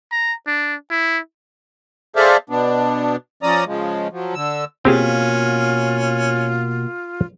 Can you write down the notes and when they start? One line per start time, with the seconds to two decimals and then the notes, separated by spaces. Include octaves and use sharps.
0.12 A#5
0.47 D4
0.91 E4
2.16 G#4 A4 C5 D5 E5 F5
2.50 B2 B3 D4
3.43 F3 C#4 D5 A#5 D#6
3.66 C#3 F3 G#3
4.12 F3 F#3
4.35 D3 E6
4.85 B2 A#3 C4 C#4 F4 G4 G#4